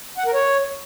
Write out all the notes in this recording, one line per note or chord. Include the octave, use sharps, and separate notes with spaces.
F#5
A#4
C#5